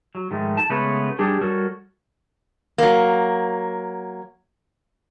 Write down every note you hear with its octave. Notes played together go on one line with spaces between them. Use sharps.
F#3
G#2 D#3 F3 G#3 A3
A5
C#3 G#3 A3 B3 B4 C#5
G3 D4 G4 G#4
G3 F#4 A4 A#4 C#5
F#3 A#3